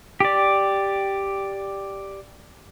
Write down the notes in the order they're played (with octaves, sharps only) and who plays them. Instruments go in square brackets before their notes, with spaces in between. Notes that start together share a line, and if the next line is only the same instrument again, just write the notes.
[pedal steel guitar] G4 D5